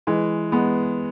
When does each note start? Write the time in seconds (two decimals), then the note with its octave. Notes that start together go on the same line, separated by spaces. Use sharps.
0.07 E3 G#3
0.52 G#3 B3